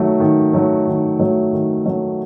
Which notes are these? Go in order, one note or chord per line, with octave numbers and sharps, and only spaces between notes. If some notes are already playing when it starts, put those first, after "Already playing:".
Already playing: D#3 F#3 A3
D#3
F#3 A3
D#3
F#3 A3
D#3
F#3 A3